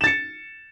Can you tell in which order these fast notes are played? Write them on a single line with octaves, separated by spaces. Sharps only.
E7 A6 C#7